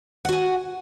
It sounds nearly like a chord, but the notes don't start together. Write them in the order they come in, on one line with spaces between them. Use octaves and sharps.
F#5 F#4 G#5